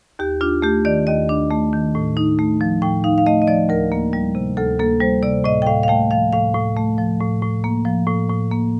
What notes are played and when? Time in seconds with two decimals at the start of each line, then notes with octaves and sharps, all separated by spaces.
0.19 D#2 G4
0.41 D4 F4
0.62 A3 G4
0.85 D#3 D5
1.07 D#2 D#5
1.29 D4
1.51 A3
1.73 D#3
1.95 A2
2.17 D#4
2.39 A3
2.61 F3
2.82 A2 G5
3.04 D#4 F5
3.18 F5
3.26 A3 D#5
3.42 D#5
3.47 F3 D5
3.69 D2 A#4
3.92 A#3
4.13 G3
4.35 C3
4.57 D2 A4
4.79 A#3 A4
5.01 G3 C5
5.23 C3 D5
5.44 A2 D#5
5.62 G5
5.66 A2 F5
5.83 F5
5.88 A3 G5
6.11 F3 F5
6.33 A2 F5
6.54 A2
6.76 A3
6.98 F3
7.21 A2
7.42 A2
7.64 A#3
7.85 F3
8.07 A2
8.30 A2
8.51 A#3